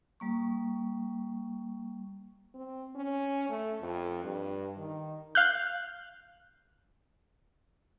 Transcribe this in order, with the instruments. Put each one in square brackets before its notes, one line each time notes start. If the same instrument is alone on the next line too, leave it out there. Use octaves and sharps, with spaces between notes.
[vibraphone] G3 A#3 C#6
[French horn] C4
C#4
A3
F2
G2
D#3
[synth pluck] F5 F#6 G6